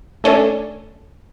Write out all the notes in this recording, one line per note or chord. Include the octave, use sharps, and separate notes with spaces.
A3 C#4 D4 A4